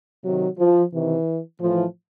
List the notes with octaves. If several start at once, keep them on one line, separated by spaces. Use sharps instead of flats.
C3 D#3 F#3
F3
C3 D#3 E3
A2 E3 F3